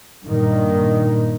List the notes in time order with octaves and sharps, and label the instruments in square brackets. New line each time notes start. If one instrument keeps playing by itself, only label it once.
[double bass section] G2 A#2 D#3